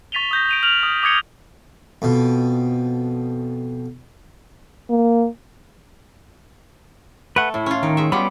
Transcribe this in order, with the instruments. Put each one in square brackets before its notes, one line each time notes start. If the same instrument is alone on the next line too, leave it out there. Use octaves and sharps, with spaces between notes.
[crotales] C#6 A6 B6 D#7 F7 G7
D#6 G6 A#6
D7 D#7 F7
F6 F7 F#7
D#6
D6 D#6 G#6 C#7 G7
[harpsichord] F2 B2
[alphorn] A#3
[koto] A3 [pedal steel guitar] B4 F#5
[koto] A2 [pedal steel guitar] E4
[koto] C#4 F4
[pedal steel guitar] D#3 [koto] D#4
[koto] G#3 E5
[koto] F#3 F4 G4 [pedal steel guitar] G3 B3 B5